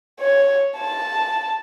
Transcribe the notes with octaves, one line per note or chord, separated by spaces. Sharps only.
C#5
A5